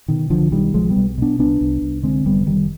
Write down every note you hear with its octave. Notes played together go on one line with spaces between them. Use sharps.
B2 D#3
B1 D3 F3
B2 D#3 G3
B1 F3 G#3
G3 B3
B1
B2 B3 D4
C2 B3 D4
C2
C2
D3 G#3 C4
F1 G3 B3
F1 D#3 G3